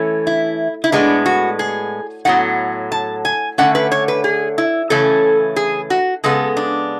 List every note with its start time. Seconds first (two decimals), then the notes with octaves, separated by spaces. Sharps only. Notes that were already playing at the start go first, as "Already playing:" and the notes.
Already playing: E3 A3 C#4
0.27 E4
0.84 E4
0.92 A2 G#3 B3 D4
1.26 F#4
1.59 G#4
2.25 A2 F#3 B3 F#5
2.92 A5
3.25 G#5
3.58 D3 A3 C#4 F#5
3.75 B4
3.91 C#5
4.08 B4
4.24 G#4
4.58 E4
4.90 C#3 E3 A3 C#4 A4
5.56 G#4
5.90 F#4
6.24 C#3 G#3 B3 A4
6.57 D4